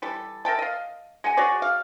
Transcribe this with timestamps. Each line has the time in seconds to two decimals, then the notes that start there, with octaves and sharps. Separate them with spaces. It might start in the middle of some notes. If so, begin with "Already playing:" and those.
0.02 E3 G3 A4
0.45 A#4 E5 G5 A5
0.59 D#5 F5
1.24 G#3 F#5 G#5
1.37 F#4 G#4 C#5 D5
1.62 F5